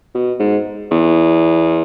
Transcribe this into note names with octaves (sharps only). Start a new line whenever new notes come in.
B2
G#2
E2